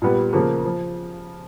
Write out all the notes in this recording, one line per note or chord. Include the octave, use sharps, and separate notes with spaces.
A#2 G3 B3
C#3 F3 A#3
F3